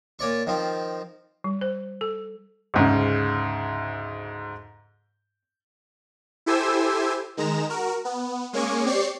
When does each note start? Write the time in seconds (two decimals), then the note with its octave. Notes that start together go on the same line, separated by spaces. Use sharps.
0.19 A#2 C#5 D5 C#6
0.47 D#3 F3 C4
1.44 G3
1.61 C5
2.01 A4
2.74 D2 G#2 C#3
6.46 E4 G4 A4 C5 G#5 E6
7.37 D#3 G#3 A#5 E7
7.70 F#4 A#4
8.05 B3
8.53 G#3 A#3 C#4 G#5 C#6 D6
8.86 C4 G4 C#5 D5 C#6 C7